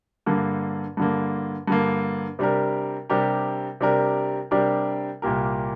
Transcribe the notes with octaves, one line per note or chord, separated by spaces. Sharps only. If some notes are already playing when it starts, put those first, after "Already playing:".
G2 D3 A#3
G2 D3 A#3
G2 D3 A#3
C3 G3 D4 G4 A#4
C3 G3 D4 G4 A#4
C3 G3 D4 G4 A#4
C3 G3 D4 G4 A#4
C2 A#2 A#3 G4 A#4